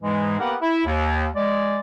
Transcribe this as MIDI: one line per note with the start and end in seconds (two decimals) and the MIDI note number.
0.03 0.38 44
0.03 0.38 52
0.03 0.38 56
0.40 0.55 58
0.40 0.55 59
0.40 0.55 67
0.40 0.55 70
0.40 0.55 71
0.40 0.55 78
0.61 0.86 64
0.86 1.27 39
1.36 1.80 56
1.36 1.80 74